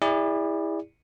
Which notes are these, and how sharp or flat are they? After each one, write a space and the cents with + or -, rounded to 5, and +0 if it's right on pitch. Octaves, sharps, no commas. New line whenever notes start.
E4 -15 G#4 -40 D5 +0